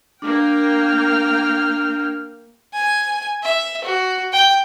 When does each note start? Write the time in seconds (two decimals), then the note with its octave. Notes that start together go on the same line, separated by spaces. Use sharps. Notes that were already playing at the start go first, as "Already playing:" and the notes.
0.22 A#3 D4 G5 F6
2.73 G#5
3.42 E5
3.84 F#4
4.32 G5